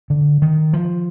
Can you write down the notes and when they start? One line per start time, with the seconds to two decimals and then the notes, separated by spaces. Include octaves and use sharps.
0.10 D3
0.42 D#3
0.73 F3